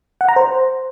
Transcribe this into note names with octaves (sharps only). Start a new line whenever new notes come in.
F#5
A#5
C5